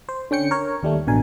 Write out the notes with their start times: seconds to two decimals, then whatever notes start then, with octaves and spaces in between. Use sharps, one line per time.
0.09 C5
0.31 D3 C#4 G5 C#7
0.51 A#4 C#5
0.83 D#2 G3 A3
1.07 A1 B2 D3 A#4 G#5